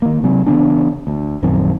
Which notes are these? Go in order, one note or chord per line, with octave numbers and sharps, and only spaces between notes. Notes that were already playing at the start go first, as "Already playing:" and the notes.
D#3 A#3
C3 F#3 C4
C#3 E3 B3 D4
D2
A#1 F#2 D#3 C4